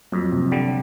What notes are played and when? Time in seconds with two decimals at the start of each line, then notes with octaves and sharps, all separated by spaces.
0.12 F2 F#3
0.32 C3
0.52 D3 G3